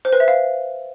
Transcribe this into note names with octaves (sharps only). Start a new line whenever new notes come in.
C5
B4
E5
F5